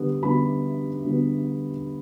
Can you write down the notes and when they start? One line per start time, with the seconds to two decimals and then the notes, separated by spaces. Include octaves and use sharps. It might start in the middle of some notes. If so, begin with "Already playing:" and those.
Already playing: D3 G3 B3
0.22 D3 G3 B3 B5
1.05 D3 G3 B3